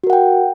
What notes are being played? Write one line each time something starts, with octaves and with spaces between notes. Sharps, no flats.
F#4 A#4 F#5 G5